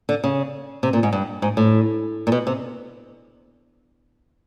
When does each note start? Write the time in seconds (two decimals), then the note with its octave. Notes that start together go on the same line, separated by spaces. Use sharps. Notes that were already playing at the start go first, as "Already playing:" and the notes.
0.09 D3
0.24 C#3
0.83 C3
0.93 A#2
1.03 G#2
1.13 G2
1.42 G#2
1.57 A2
2.27 A#2
2.32 B2
2.47 C3